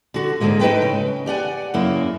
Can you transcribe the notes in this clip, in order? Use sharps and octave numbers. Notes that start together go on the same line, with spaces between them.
D3 F#4
G#2 B2 D3 G#3 A#3
A3 D#4 E4 B4 G5
C#3
G4 D5 F#5 G#5
F#2 C#3 A#3 E4